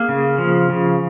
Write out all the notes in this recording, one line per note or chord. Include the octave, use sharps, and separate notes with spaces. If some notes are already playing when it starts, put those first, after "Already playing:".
Already playing: A#3 G#4
C#3
F3
C#3